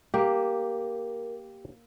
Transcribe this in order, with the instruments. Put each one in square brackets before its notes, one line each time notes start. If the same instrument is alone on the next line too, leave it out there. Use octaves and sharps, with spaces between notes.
[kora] A#3 [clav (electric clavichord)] G4 [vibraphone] A#4